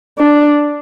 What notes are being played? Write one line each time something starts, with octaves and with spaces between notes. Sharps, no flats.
D4